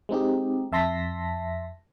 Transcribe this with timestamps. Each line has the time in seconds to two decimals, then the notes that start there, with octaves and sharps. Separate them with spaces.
0.09 G#3 C4 D#4 G4
0.72 F2 E5 A5 C6 A#6 B6